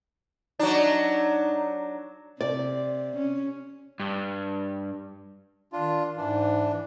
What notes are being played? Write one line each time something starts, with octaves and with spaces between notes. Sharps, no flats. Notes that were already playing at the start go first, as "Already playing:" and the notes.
F#3 D4 D#4
C3 D5
C#4
G2
D#3 D4 F4
G#2 E3 D4